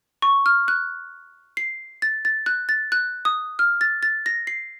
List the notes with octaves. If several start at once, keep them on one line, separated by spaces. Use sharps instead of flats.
C#6
F6
F#6
C7
A6
A6
F#6
A6
F#6
D#6
F6
A6
A6
A#6
C7